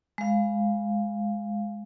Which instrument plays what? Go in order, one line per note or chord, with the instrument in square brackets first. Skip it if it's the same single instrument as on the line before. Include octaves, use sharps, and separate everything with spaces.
[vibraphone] G#3 F5